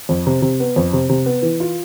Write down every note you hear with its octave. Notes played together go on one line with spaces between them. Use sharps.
F2
C3
C3
B3
F2
C3
C3
B3
E3
F4